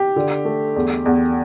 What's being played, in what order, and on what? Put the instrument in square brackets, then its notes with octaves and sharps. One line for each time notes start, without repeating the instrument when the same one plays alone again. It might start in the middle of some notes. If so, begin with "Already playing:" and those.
Already playing: [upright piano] G4
D3
A3
E2
E2